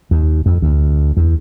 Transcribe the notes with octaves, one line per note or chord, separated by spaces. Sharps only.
D#2
F2
D2
E2